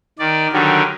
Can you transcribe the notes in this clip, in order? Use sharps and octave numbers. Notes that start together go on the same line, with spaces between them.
D#3 D5
D3 D#3 F#3 G3